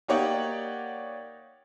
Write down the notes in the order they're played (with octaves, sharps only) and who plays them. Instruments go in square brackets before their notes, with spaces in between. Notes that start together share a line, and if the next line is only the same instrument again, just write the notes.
[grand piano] A#3 D#4 G4 C#5 D5 F#5